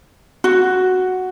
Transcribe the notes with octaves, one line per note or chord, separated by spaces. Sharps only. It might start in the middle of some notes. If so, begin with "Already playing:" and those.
F#4